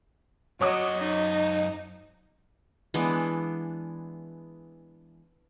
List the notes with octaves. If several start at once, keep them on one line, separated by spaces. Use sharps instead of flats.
F#2 F#3 C#5 D#5 D6 D#6
D#4
E3 G#3 B3 D4